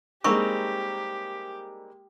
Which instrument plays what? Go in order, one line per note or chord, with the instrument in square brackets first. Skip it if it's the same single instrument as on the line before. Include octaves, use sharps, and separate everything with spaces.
[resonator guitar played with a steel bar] G3 C4 D#4 [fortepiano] G#3 A#3 A#5 [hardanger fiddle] G4 [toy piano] C#6